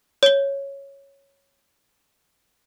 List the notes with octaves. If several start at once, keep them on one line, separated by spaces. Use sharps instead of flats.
C#5 G7